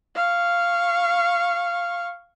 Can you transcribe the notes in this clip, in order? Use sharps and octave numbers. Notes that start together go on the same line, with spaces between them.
F5 C#6